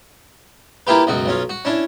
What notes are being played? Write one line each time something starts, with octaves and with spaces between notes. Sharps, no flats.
A#3 E4 F4 G4 B4
C#2 F#2 B2 F#4
B1 C#4 F4
F#4
C#4 D4 E4